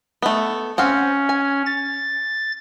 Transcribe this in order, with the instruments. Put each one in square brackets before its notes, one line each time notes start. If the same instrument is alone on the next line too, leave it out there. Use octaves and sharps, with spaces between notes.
[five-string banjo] A3 B3
[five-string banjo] C4 F5 F#5 [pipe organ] C#4
[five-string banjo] G#5
[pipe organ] A6